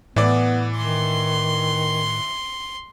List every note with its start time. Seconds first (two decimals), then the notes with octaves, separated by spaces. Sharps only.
0.16 A2 E3 B3 D5
0.78 D#3 C6